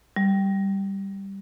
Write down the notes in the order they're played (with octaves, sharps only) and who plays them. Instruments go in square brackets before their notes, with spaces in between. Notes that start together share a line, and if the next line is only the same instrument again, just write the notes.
[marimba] G3